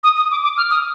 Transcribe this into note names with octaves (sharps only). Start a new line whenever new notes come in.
D#6
D#6
D6
D6
F6
D#6